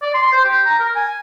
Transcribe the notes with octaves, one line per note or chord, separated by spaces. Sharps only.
D5
C6
C5
G4
A#5
A#4
G#5